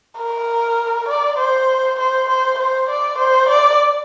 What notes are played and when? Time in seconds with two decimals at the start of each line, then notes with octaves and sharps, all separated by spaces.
0.18 A#4
1.08 D5
1.38 C5
1.99 C5
2.29 C5
2.58 C5
2.89 D5
3.18 C5
3.48 D5